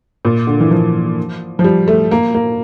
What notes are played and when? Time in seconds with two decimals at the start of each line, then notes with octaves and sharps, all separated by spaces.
0.25 A#2
0.47 D3
0.61 E3
0.71 F3
1.59 F3
1.64 G3
1.88 A3
2.11 A#3
2.34 A#3